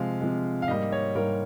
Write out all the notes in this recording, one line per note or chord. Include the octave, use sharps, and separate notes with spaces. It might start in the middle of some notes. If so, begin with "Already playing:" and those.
Already playing: C3 F3 G#3 F5
C3 F3 G#3
F5
G#2 G3 A#3 D#5
C#5
G#2 G3 A#3 A#4